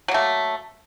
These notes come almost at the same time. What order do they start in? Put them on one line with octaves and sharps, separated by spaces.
F#3 A#3 A3